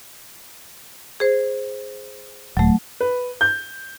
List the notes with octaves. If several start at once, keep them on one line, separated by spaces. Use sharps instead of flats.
G#4 C5
D#1 F#3 A3
B4
G6